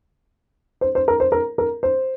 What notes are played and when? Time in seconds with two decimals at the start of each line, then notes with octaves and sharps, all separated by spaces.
0.81 C5
0.95 C5
1.08 A#4
1.20 C5
1.32 A#4
1.58 A#4
1.83 C5